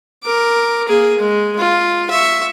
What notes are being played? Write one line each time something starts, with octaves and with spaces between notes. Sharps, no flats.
A#4 D6
A#3 G#4
G#3
F4
E5 C#6